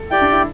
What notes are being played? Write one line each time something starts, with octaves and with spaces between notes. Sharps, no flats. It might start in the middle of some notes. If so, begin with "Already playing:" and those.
Already playing: A4
E4 G4 D5 G5
D4
E4